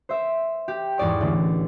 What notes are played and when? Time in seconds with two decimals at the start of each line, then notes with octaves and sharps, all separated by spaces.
0.09 C5 E5
0.68 G4
0.98 E2 G#2 D5 C#6
1.21 A1 D3